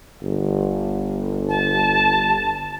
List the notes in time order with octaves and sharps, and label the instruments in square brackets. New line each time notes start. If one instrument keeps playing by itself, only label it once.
[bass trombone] G1
[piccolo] A5